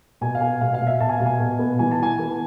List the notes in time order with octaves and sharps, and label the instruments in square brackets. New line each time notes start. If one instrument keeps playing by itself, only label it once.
[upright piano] B2 G#5
F5
B3 G#5
B2 F5
F5
B2
E5
B2 A5
G#5
B2 F5
G#5
B2
B3
E3 G#5
A5
E3 G#5
B3